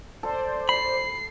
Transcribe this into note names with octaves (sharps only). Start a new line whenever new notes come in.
A4 C5 D5
B5 C7